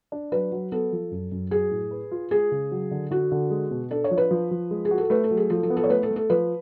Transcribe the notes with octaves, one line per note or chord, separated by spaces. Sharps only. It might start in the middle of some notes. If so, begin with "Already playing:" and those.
D4
F#3 B4
F#3
B3 A4
F3
F#2
F#2
F#3 G#4
A2
B4
F4
G#3 G#4
C#3
F#3
D3
D3 F#4
D3
G#3
B2
D4 A4
C#5
F3
B4
F3
F3
G#3
G#4
F#4
A4
A3 B4
A4
F#3
G#4
F3 A4
A4
B3
A4
C#5
A3 B4
A4
A3
A4
F3 B4